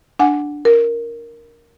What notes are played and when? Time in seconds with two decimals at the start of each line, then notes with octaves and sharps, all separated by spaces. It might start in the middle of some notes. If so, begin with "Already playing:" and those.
0.19 D4 F#5 G#5
0.65 A#4